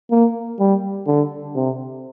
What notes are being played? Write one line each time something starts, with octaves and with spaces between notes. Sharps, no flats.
A#3
G3
D3
C3